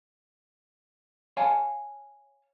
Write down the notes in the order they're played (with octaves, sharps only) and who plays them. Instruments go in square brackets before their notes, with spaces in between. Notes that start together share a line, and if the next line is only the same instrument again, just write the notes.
[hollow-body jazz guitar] C#5 F5 G#5 A5